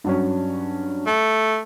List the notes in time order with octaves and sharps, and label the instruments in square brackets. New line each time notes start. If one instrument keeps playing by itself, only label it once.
[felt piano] G2 F#3 C#4
[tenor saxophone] A3